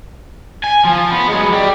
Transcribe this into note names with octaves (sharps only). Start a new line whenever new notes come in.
G#5
F3
B3
F#3 G#3
G3 G4